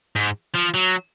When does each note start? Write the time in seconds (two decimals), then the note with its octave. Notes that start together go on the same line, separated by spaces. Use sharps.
0.16 G#2
0.54 F3
0.74 F#3